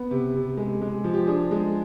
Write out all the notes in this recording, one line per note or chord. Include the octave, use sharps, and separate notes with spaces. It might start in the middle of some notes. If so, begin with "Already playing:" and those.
Already playing: B3
C3
C3
G#3
G#3
F3
G4
D4 G#4
G#3